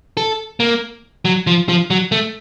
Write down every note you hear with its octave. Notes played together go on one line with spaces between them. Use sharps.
A4
A#3
F#3
F3
F3
F#3
A3